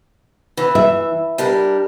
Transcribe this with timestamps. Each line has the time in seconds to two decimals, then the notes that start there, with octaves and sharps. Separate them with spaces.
0.57 E3
0.75 E5
1.38 G3 D4 A#4